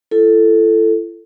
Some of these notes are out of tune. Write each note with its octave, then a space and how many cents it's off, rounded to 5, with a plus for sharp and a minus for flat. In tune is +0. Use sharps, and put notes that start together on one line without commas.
E4 +45 A4 +0